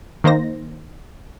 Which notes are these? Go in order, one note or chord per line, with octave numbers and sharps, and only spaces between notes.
D#3 A#3 D#4 C5 A#6